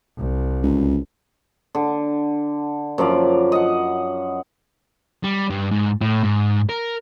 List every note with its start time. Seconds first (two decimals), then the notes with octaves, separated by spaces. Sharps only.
0.18 C2
0.63 C#2
1.75 D3
2.98 F#2 F3 A#4 D5
3.52 D#5 F#5
5.24 G3
5.50 G2
5.71 G#2
6.01 A2
6.23 G#2
6.69 A#4